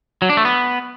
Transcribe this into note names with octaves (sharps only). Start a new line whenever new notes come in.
F#3
D4
A3
B3